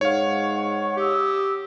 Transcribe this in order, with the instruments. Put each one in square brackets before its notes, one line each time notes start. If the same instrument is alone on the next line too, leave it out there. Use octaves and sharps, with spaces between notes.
[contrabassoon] G#2 [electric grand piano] C#5 F5 [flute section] F#5 C#6
[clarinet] G4 [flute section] D#6 E6